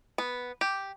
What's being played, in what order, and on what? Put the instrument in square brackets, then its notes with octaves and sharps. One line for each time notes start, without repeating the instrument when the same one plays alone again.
[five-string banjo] B3
G4